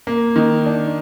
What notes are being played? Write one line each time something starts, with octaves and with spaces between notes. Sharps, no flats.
A#3
D#3
D4